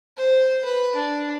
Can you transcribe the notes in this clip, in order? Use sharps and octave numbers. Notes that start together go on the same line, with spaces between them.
C5
B4
D4